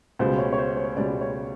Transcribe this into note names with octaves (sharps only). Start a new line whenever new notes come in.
C#2 B2 G3 C5
C#5
C#5
C5
C#5
C#2 B2 G3 D5
C#5